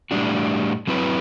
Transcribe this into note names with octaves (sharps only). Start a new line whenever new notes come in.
A2 G3 D4 F#4
F#3 C4 E4 B4